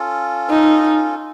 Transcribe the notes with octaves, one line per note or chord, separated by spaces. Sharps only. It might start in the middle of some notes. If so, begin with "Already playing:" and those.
Already playing: C#4 F4 A4
D#4